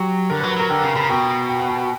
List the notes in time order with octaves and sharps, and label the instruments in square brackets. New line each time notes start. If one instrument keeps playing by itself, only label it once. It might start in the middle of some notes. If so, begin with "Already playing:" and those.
Already playing: [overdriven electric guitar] F#3 [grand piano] G4
[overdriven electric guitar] D3 [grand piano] A#4
[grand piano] B4
[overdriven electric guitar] F#3
[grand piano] B4
[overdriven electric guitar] F#3 [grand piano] A#4
[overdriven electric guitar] D3 [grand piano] G5
[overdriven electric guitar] C#3
[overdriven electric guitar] C#3 [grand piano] B5
[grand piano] A#5
[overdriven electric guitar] B2 [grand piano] G5
[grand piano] G5
F#5
G5